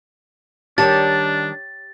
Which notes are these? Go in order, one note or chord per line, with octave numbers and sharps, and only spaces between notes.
D#3 G3 D4 G4 C#5 A5 A6